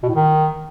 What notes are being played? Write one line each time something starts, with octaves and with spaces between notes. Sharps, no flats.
B2
A2
D#3